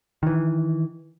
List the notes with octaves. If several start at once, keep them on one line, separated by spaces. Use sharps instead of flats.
D#3 E3